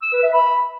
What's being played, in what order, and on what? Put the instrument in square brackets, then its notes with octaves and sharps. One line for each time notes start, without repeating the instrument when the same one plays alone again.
[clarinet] E6
B4
E5
B5